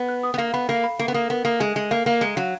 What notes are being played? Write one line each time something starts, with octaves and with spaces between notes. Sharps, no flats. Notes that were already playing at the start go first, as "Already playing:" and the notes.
Already playing: B3
F#6
D#6
B3
A#3 F5
B3 B5
A#3 F5
B5
A#3 A#4
B3
A#3 D#6
B3 A#4
A#3 D#6
G#3 G#5
G#3 G#5
A#3 F5
A#3 F5
G#3 A#5
F#3 F5